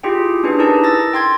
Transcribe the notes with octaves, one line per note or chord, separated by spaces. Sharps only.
E4 F4 G4 G#4 G5
C#4 D4 G4 G#4 B4
D#4 E4 G#4 A#4 B4 A5
E6 A6 A#6
G5 C6 G#6 A6